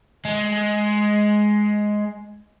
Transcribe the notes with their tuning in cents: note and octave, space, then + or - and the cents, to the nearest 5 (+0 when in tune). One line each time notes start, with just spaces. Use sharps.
G#3 +10